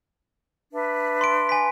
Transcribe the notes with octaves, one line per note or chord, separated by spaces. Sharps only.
D4 B4 E5
C6 D7
G#5 B6